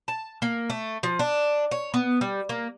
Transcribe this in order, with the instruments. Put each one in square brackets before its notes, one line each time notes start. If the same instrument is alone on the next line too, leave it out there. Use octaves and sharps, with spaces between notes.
[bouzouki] A5
A#3
A3
F3
D4
C#5
B3
G3
A#3